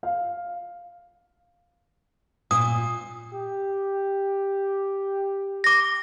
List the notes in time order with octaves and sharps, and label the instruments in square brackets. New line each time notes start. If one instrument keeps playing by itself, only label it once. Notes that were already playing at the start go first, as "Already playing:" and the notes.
[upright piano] F5
[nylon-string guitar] A#2 [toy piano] D#6
[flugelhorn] G4
[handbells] D6 A#6